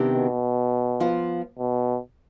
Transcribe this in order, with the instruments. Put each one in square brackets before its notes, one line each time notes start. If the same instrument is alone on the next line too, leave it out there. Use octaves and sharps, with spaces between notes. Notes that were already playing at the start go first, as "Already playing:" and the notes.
Already playing: [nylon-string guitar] C3 D#3 B3 D4 G4
[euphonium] B2
[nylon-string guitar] F3 B3 F4
[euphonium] B2